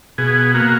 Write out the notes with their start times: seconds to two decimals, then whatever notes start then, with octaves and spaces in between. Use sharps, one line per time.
0.18 B2 G#4
0.54 A#3 F#4